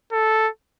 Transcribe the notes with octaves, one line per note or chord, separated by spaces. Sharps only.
A4